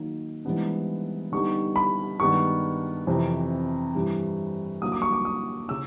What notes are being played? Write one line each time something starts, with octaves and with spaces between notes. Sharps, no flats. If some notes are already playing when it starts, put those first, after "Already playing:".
Already playing: D#3 F#3 A#3 D#4
G#2 E3 G3 B3 D4
D3 G3 B3 D#4 C#6
B5
G2 D#3 G#3 B3 D4 C#6
F2 C3 E3
G2 E3 G3
D3 F#3 A#3 D#6
D6
C#6
D6
D#6
C#3 E6